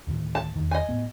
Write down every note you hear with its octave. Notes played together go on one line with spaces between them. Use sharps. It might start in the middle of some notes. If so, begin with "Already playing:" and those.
D2 A2 D#3
A5
E2 D#3
D#5 G#5
A2 B3